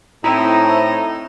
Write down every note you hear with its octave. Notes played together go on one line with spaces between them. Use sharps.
A2 C4 D#4 E4 A#5